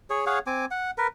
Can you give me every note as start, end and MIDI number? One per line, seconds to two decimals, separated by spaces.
0.10 0.25 68
0.10 0.25 73
0.26 0.39 68
0.26 0.39 73
0.26 0.39 77
0.26 0.39 78
0.47 0.65 60
0.47 0.65 80
0.47 0.65 86
0.71 0.91 78
0.98 1.07 70
0.98 1.07 71